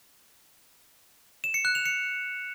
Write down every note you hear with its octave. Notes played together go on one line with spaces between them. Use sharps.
E7
C#7
F#6
F7
C#7